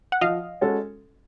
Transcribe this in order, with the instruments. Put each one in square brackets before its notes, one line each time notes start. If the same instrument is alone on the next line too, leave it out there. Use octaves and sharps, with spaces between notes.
[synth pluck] F#5
[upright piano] F3 [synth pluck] D#5 F5
[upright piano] G#3 C#4 F#4 A4